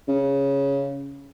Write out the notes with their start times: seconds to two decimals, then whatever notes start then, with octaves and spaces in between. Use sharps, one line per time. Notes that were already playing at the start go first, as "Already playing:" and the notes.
0.08 C#3